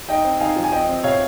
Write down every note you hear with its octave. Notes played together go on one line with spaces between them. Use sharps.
D#4 D#5 G5
C4
D#4 F5 G#5
F3
G#5
C4 D#5 G5
C4
C3 C#5 F5